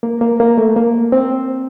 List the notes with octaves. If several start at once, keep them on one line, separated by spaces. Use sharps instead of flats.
A#3
A#3
A#3
A3
A#3
C4